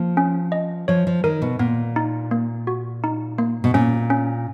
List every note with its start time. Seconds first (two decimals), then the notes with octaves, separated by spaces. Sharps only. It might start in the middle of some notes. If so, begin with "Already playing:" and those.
Already playing: F3 A#3
0.17 C#4
0.52 D#5
0.88 F3 C#5
1.07 F3
1.24 D#3 A#4
1.42 B2
1.59 A#2 B3
1.96 D#4
2.31 A#3
2.67 F#4
3.04 D#4
3.38 A#3
3.64 B2
3.74 A#2 C#4
4.10 C#4